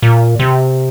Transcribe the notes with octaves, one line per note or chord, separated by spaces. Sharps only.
A#2
C3